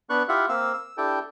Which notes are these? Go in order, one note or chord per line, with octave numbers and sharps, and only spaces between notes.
B3 D4 B4 C#6 F#6
E4 F4 G4 E5 F#5
A#3 C4 F5 E6
E6
D4 E4 G4 A4 G5